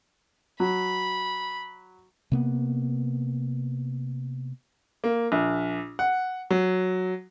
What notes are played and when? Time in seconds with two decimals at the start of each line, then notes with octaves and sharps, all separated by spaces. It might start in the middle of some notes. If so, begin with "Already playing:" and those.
0.60 F#3 B5
2.32 C3 A#3 B3
5.04 A#3
5.32 A#1
5.99 F#5
6.50 F#3